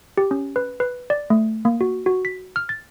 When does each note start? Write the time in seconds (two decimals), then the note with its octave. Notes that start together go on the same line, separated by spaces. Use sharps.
0.17 G4
0.31 C#4
0.56 B4
0.80 B4
1.10 D5
1.30 A3
1.65 A#3
1.81 F#4
2.06 F#4
2.25 B6
2.56 F6
2.69 A6